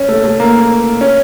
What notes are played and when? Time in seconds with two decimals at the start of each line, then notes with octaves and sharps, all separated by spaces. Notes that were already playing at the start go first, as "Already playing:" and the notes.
Already playing: C#4
0.08 A3
0.24 A3
0.40 A#3
1.01 C#4